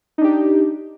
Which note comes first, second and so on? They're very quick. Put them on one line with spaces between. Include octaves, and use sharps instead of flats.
D#4 D4 G4